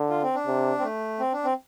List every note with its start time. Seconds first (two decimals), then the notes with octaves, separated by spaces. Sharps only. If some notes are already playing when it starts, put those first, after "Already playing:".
Already playing: D3
0.10 F4
0.23 C4
0.35 D4
0.47 C3
0.79 C4
0.83 A3
1.20 C4
1.33 D4
1.44 C4